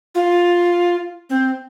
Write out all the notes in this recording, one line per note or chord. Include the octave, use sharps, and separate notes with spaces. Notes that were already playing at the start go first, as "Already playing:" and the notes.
F4
C4